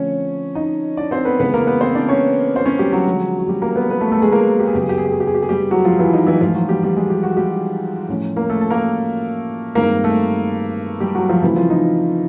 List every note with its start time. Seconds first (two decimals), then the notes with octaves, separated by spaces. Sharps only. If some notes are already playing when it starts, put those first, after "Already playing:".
Already playing: D3 F3 A3 C4 C#4 C#5
0.55 D#4 D#5
0.97 D4 D5
1.11 C4 C5
1.25 B3 B4
1.39 C#3 E3 G#3 B3 B4
1.54 A#3 A#4
1.67 B3 B4
1.81 C4 C5
1.95 D4 D5
2.09 C#4 C#5
2.56 C5
2.66 C#4 C#5
2.79 G3 G4
2.92 F#3 F#4
3.07 D3 F3 G#3
3.39 F#4
3.48 G3 G4
3.62 A#3 A#4
3.76 B3 B4
3.90 B3 B4
4.00 A3 A4
4.12 A3 A4
4.22 G#3 G#4
4.32 A#3 A#4
4.60 G4
4.67 G#4
4.74 F#2 C#3 F#3 B3 G4
4.82 G#4
4.89 G4
4.98 G#4
5.05 G4
5.12 G#4
5.20 G4
5.27 G#4
5.35 G4
5.42 G#4
5.49 G3 G4
5.71 F#3 F#4
5.85 F3 F4
5.99 E3 E4
6.13 D#4
6.27 E3 E4
6.41 G#2 E3 F3 A3 F4
6.55 F#3 F#4
6.69 G3 G4
6.83 G3 G4
6.97 G#3 G#4
7.10 G4
7.23 F#4
7.37 G3 G4
8.09 A2 F3 A3 C#4
8.36 A#3 A#4
8.50 A3 A4
8.61 A4
8.70 A#3 A#4
9.75 G2 D#3 G#3 A#3 C4 A#4
10.04 A3 A4
11.00 G3 G4
11.15 F#3 F#4
11.29 F3 F4
11.42 C#3 E3 F#3 A3 C4 E4
11.56 F3 F4
11.70 D#4